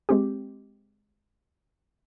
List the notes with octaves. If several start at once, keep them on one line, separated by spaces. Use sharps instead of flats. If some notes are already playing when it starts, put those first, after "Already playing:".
G#3 C4 G4